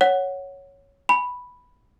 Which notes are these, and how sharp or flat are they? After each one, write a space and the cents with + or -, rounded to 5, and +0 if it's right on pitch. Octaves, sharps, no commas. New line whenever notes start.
C#5 +0 F#5 +0
G#5 +0 B5 +0